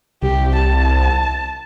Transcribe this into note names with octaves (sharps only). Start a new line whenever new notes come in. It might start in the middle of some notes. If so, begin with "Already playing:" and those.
C2 G4
A5